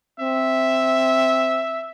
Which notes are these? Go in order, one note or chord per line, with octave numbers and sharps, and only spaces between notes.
C4 E5